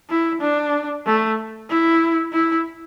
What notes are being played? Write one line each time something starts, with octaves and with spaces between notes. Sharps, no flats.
E4
D4
A3
E4
E4